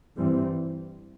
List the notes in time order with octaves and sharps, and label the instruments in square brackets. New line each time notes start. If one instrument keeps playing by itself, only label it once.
[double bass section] G2 E3 G3 C4